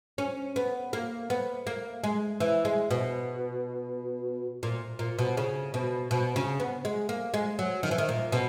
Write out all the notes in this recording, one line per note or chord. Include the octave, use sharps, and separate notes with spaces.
C#4
B3
A#3
B3
A#3
G#3
E3
G#3
B2
A#2
A#2
B2
C#3
B2
B2
C#3
B3
G#3
A#3
G#3
F#3
D#3
E3
D#3
A#2
B2